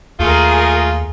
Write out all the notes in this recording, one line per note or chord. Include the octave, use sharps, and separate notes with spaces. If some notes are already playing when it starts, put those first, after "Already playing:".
D#2 A3 F4 G#4 A#4